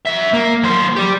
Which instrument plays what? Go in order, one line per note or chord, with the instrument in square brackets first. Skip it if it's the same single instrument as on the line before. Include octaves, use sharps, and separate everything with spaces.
[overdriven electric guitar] F#3 E5
A#3
F#3 C5
G4 D5